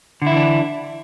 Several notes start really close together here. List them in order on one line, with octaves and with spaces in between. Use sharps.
D3 E4 E3 D4